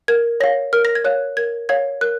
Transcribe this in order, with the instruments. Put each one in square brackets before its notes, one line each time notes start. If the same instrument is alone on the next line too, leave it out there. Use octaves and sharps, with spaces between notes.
[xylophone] A#4 G#6
C#5 F5 A#6
A#4 F6
A#6
G#6
C#5 F5 F#6
A#4 G#6
C#5 F5 G#6
A#4 F#6